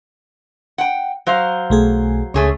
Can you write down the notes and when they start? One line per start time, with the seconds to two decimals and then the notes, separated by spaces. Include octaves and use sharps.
0.78 F#5 G5
1.27 F#3 C5 F5
1.70 B1 A3 G#4
2.34 C#2 A3 G#4 C#5